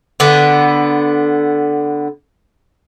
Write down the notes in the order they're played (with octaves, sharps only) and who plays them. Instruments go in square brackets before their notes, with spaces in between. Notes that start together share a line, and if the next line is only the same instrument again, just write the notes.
[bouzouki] D3 B3